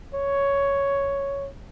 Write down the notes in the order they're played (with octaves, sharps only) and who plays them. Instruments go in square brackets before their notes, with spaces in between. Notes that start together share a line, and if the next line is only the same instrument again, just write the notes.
[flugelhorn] C#5